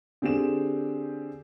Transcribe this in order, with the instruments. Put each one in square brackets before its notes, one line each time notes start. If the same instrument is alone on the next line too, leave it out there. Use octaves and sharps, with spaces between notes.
[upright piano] D3 C4 G4 G#4 E7